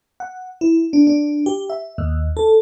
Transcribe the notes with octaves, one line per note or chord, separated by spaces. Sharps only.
F#5
E4
D4
D4
G4
E5
D#2
A4